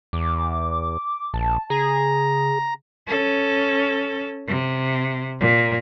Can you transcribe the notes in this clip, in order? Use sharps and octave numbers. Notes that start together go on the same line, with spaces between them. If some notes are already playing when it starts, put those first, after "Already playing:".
E2 D6
A#1 A5
C#3 G#4 A#5
C#4 A4
C3
A#2